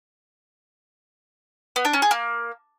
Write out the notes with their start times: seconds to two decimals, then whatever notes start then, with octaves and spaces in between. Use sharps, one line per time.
1.76 B3
1.85 D4
1.93 C#4
2.02 G#4
2.11 A#3